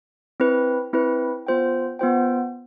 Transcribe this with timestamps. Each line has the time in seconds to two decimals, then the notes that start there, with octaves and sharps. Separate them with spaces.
0.40 C4 E4 B4
0.93 C4 E4 B4
1.47 B3 F4 C5 G5
1.99 B3 F4 C5 G5